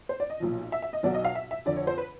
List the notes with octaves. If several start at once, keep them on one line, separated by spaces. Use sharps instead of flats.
C5
D5
D#5
B1 A#2 F3
E5
E5
D#5
B1 B2 F#3 D5
D#5
F5
E5
E5
F2 D3 F3 D5
C#5
C5
B4